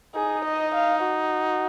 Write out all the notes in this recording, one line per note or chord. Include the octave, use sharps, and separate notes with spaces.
D#4 G#4
D#5
F5
F#4